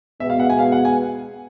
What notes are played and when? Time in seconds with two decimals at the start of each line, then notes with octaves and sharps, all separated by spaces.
0.20 B2 G#3 B3 E5
0.30 F5
0.39 F#5
0.50 G#5
0.59 F5
0.72 F#5
0.85 G#5